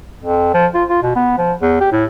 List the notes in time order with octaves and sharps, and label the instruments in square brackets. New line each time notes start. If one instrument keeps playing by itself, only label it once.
[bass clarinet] F2
F3
F4
F4
B2
B3
F3
E2
G4
A2